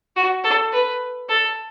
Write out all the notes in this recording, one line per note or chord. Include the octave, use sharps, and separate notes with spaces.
F#4
A4
B4
A4